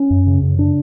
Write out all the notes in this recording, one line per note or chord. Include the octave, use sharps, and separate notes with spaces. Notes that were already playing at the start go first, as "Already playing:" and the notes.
Already playing: C#4
F#2
C#3
F#2
C#3 D4